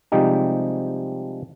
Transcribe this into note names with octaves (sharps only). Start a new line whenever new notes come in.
C3 F3 G3 G#3 D#4 G4